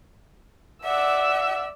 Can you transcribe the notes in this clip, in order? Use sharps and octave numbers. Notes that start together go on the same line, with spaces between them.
D5 E5 F#5 E6